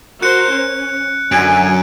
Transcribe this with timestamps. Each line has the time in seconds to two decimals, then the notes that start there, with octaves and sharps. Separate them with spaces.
0.22 F#4 A#4 C5 F#6 C#7
0.53 C#4
1.32 F#2 D3 F#3 G#5 D7